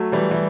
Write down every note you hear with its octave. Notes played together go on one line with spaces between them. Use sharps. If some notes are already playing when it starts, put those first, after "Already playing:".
Already playing: F#3 A3
E3 G3
E3 G3